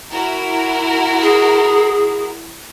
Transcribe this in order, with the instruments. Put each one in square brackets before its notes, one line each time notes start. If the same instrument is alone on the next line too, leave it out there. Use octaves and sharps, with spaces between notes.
[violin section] E4 F#4 A#4
[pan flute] G#4